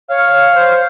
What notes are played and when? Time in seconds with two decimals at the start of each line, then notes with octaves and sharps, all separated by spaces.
0.09 C#5 F5
0.32 C#5
0.55 C5